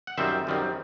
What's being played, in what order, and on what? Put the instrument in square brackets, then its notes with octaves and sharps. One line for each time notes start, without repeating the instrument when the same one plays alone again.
[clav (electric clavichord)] F#5
F#2 D#3 G3 C4 C5 E5
F#2 D#3 G3 C4